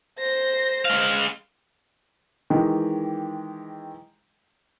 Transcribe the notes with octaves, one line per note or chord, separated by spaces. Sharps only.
C5 A#6
G#3 F5
D#3 E3 G#3 G4